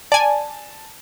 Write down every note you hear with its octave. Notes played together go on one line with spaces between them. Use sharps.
D5 G#5 A5